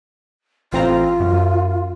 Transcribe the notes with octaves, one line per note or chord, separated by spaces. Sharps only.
A1 C4 F4 A#5
F#2